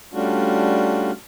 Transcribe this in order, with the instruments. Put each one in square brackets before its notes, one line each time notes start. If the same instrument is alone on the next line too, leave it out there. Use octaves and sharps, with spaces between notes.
[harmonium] G3 A3 C#4 D4 F4 F#4